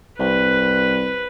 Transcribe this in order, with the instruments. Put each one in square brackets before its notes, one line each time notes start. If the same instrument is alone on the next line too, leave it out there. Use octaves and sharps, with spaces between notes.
[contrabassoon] C2 [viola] B4